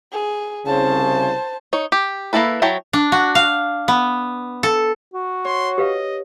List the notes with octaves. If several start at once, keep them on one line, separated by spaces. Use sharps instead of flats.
G#4
C2 C#3 C5 A5
D#4 C#5
G4
A#3 C4 E4 A4 B4
F#3 E4 C#5 G5 A5
D4
F#4
F5
B3
A4
F#4
C#5 C6
G4 B4 D#5 F5